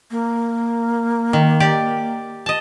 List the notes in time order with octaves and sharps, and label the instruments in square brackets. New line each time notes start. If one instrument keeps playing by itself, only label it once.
[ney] A#3
[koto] D#3
G4 D5
D#5 A5